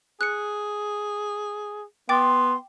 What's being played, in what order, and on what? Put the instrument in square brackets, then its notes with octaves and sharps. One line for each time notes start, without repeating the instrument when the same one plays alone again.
[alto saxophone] G#4 [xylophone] F#6 C#7
[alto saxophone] B3 [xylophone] G5 D6 A6 [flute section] C6